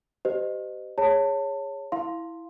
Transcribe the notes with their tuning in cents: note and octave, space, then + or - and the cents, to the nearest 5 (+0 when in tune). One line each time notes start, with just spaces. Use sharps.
G4 -25 C5 -35 D#5 -20
G#4 -20 C#5 +0 A5 +25
E4 +0 F5 +0 C6 +0